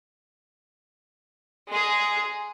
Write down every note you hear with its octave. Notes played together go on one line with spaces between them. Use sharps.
G#3 G#4